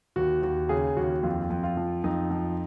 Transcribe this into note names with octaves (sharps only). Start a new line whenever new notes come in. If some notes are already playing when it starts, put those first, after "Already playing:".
D#2 F#4
D#2 F#4
C#3 G#4
D#2 F#4
F2 F4
F2
F4
F3
F2 D#4
F3